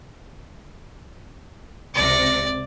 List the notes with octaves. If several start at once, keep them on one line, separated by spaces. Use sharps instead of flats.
C#2 C3 D5 A#6